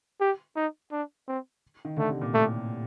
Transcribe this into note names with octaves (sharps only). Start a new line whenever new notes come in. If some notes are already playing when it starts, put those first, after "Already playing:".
G4
D#4
D4
C4
D#3
D3 A3
C3
A#2
A2 A3